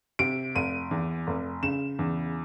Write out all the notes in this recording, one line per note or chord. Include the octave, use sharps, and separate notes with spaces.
C3 D7
F1 D#7
E2
F1
C#3 E7
E2